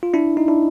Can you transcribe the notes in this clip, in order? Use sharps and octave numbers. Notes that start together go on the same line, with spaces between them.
F4
D4 E4
D#4
D4 E4